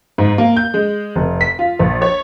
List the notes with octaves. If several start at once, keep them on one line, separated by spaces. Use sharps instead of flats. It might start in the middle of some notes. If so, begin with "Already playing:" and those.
G#2
A#3
G6
G#3
F1
B6
F4
A#1
C#5